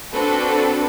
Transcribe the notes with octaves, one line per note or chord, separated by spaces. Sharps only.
C4 D4 F#4 A4 B4